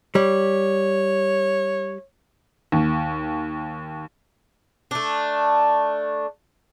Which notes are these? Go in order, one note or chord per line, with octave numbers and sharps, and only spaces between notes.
G3 C#5
D#2
A3 D4